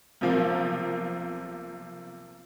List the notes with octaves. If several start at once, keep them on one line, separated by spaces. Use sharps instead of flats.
B1 C3 F3 A#3